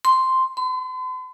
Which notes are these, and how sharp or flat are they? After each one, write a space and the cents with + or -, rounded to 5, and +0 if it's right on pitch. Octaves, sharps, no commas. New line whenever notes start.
C6 -5
C6 -45